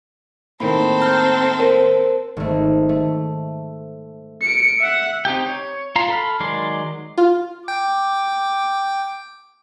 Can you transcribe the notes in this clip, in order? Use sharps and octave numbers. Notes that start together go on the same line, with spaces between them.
A2 D#3 A#3 C4 A4 B5
A#5 F6 G6
A#4 C5
G#1 A3
A3
C#7 D7
E5 F#5
C4 D#4 G4 G5
C#5
F4 A#5 C6
A4 B5 F6
D#3 F#3 G#3 D5 C6
F4
G5 D6